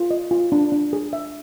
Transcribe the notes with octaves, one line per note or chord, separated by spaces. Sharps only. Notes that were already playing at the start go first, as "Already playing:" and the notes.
Already playing: F4
D#5
F4
D4
D4
G#4
E5